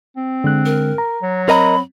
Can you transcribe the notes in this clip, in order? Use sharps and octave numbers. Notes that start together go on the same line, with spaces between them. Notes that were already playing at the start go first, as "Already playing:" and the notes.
C4
D3 G#3 F#6
A#4
A#5
F#3
C4 A#4 D#5 A#5 B5